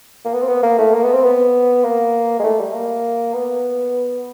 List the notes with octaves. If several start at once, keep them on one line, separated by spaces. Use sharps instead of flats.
A#3
B3
C4
B3
A#3
A3
A#3
B3
C4
B3
A#3
G#3
A3
G3
A#3
B3